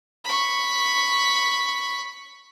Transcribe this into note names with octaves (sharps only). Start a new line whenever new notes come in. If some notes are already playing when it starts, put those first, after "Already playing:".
B5 C#6